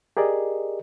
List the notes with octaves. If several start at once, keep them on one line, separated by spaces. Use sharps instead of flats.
G4 G#4 A#4 D5 D#5